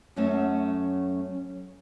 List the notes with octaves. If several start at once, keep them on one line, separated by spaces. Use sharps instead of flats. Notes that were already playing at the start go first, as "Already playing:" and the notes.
F#2 F#3 A3 C#4 C#5 E5